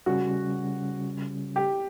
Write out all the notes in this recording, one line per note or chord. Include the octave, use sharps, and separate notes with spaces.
C#3 G3 C#4 F#4
G4